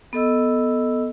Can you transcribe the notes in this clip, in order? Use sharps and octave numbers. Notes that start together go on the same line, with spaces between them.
B3 A4 D#5 E6